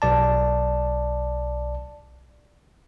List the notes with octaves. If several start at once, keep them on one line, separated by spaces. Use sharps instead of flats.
B1 D5 A5